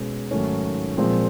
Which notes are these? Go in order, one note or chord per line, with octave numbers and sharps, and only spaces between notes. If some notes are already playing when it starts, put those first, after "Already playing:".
Already playing: B2 G#3 C#4
G#2 D#3 F#3 A3 C#4
A#2 F3 G#3 C4